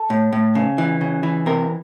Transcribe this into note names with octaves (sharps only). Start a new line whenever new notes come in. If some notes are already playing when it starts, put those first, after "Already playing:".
Already playing: A4
A2
A2
C#3
E3
C#3
E3
C3 A#4